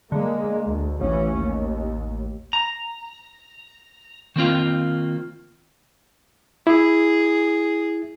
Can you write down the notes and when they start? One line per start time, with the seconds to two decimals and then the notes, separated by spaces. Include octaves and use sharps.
0.12 D3 G#3 A#3
0.67 D2
1.01 A1 E3 C#4
1.36 D#2
2.53 A#5
4.36 D#3 A#3 C4 F4
6.67 E4 G#4